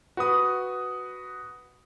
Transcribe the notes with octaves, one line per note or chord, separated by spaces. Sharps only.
F#4 B4 D#6